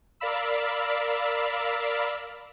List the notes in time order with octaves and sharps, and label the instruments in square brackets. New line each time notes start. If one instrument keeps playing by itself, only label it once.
[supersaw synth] A#4 D5 F5 B5 E6